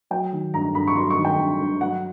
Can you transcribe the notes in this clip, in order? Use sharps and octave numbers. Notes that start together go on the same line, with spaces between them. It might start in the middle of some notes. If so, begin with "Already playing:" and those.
F#3 G5
D#3
G2 A#5
G2 B5
C#6
F#3 C6
C#6
D#3
G5
G2
G2
F#3 F#5